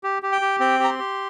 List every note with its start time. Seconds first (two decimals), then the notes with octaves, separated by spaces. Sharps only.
0.04 G4
0.23 G4
0.32 G5
0.41 G4
0.60 C4 G5
0.79 G4 A#5
0.89 C6
0.99 G4